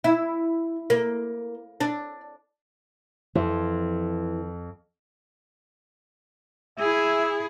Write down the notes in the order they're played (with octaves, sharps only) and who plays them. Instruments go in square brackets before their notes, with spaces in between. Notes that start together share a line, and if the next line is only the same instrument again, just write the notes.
[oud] E4
A#3
D4
[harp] F2 [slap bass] E3
[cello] E4 G#4 [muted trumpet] E5